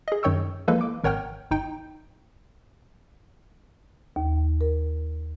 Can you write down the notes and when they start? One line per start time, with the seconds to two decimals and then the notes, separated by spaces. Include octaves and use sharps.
0.08 G#4 D#5
0.23 F#2 D#3 C#5 G5 C#6 E6
0.68 E3 F3 G#3 A#3 A4 B4
0.81 D6
1.04 G#1 A#4 C#5 F#5 G5 F6
1.51 G1 D#4 G5
4.16 D#2
4.61 A#4